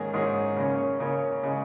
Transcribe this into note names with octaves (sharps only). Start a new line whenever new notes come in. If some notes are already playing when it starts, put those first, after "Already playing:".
Already playing: G#2 D#3 A#3 C#4 G#4
G#2 D#3 A#3 C#4 G#4
C#3 A#3 C#4
C#3 A#3 C#4
C#3 G#3